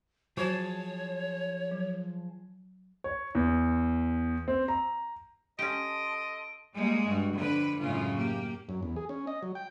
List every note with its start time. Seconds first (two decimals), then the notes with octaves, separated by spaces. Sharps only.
0.37 F3 F#3 F#4 G#4 C5 C#5 A5
1.71 F#3
3.04 C#5
3.35 E2
4.48 C4
4.68 A#5
5.59 C#4 G4 A4 D#5 A5 C6 D7
6.74 G3 G#3 A#3
7.06 G2 F#4
7.35 F2 D3 B4
7.80 F#2 A2 C#3 G#3 C#4 F4
8.16 A#3 G4
8.69 F#2
8.83 E2
8.96 G#4
9.09 C#4
9.27 D#5
9.43 F#3
9.55 G5